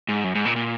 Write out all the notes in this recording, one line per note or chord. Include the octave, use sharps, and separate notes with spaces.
G#2
F#2
G#2
A#2
A#2